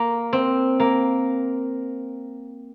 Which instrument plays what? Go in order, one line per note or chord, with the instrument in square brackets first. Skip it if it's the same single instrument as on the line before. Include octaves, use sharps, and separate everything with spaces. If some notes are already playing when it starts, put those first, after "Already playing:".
Already playing: [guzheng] A#3
C4
A#3